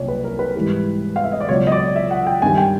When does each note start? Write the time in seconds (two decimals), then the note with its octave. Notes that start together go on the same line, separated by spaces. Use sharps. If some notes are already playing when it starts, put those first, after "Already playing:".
Already playing: C2 A#2 F#3 C#5 D5
0.08 B4
0.24 A#4
0.39 B4
0.55 G#2 E3 G3
1.16 F5
1.24 E5
1.32 D#5
1.40 D5
1.49 C#2 B2 F#3 C#5
1.67 D#5
1.72 D5
1.96 E5
2.11 F#5
2.27 G5
2.42 G2 D#3 G3 G#5
2.57 G5